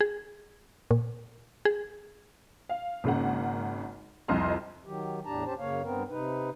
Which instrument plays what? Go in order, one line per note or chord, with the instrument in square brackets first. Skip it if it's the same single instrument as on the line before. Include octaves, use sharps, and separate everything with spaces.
[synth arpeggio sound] G#4
A#2
G#4
[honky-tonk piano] F5
G#1 C#3 A#3 F#5
C2 F2 D#5 C6 F6
[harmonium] D#3 F#3 G4
E2 A2 D4 G4 A5 A#5
D#2 C#4 G4 C5 A5
F#2 C#3 A#3 C#5 F5
G2 B3 C4 A#4
C3 D#4 B4